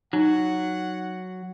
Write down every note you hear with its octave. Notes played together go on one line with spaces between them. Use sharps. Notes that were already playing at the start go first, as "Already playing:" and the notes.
F#3 D#4 F#5